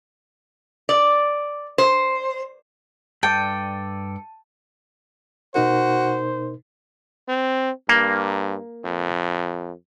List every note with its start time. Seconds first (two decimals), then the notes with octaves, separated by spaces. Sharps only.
0.89 D5
1.78 C5
3.23 G2 A4 D5 G5 A5
5.55 B2 D#4 F#4 A#4 C5
7.29 C4
7.89 G2 A#3
8.85 F2